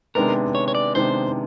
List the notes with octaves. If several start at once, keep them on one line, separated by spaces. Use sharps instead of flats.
C3 D#3 G#3 B3 D4 A#4
C#5
C#5
D5
C3 D#3 G#3 B3 D4 C5